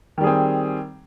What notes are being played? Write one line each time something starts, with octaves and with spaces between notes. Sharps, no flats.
D#3 G3 C4 G#4